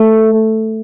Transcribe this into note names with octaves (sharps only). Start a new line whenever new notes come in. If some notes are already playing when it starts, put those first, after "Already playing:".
Already playing: A3